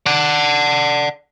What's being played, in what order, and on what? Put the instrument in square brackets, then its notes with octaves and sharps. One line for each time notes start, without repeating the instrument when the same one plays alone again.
[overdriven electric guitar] D5 F#5